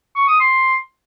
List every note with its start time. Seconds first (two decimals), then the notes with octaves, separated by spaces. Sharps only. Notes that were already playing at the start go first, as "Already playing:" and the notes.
0.16 C#6
0.28 D#6
0.40 C6